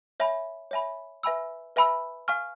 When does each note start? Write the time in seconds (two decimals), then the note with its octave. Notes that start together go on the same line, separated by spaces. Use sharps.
0.20 C#5 E5 G#5 B5
0.71 C#5 E5 G#5 B5
1.23 B4 E5 G#5 B5 E6
1.76 B4 E5 G#5 B5 E6
2.28 F5 G#5 C#6 F6